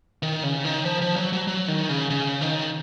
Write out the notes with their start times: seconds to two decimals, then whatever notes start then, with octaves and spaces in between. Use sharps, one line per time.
0.23 D#3
0.43 C#3
0.64 D#3
0.85 F3
1.02 F3
1.16 F#3
1.33 F#3
1.47 F#3
1.68 D#3
1.89 C#3
2.10 C#3
2.41 D#3